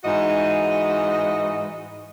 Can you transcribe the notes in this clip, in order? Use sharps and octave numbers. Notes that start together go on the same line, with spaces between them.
G#2 E3 F#4 D#5